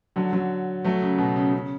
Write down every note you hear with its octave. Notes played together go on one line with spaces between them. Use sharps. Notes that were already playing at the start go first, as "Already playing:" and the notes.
D3 F#3
D3 F#3
F#3 A3
C#3
B2
C#3
C#3